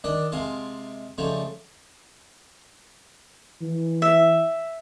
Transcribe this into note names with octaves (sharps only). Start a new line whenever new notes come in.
D#3 D4 D5 D#5
C3 G#3 D#5 F5 A5
C#3 F3 G3 A3 D#4
E3
E5